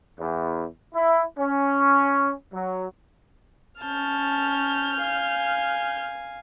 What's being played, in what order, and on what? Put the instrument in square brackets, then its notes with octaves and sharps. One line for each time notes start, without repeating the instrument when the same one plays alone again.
[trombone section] E2
E4
C#4
F#3
[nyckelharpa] C#4 A5 [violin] F6 G6
[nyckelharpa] F5 G#5